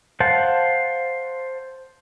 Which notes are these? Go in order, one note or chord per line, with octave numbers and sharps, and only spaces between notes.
C5 F5 F#5 A5